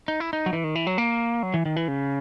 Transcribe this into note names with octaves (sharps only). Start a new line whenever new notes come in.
D#4
E4
D#4
F#3
E3
D#3
E3
F#3
A#3
F#3
E3
D#3
E3
C#3